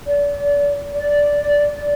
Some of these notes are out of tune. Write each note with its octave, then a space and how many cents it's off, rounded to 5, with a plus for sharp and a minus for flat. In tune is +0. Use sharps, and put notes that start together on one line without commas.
D5 -35
D5 -10